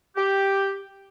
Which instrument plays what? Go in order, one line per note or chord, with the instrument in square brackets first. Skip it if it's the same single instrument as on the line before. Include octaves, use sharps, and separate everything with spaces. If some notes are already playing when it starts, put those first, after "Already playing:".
[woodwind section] G4